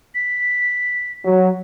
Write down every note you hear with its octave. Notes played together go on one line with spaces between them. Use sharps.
B6
F#3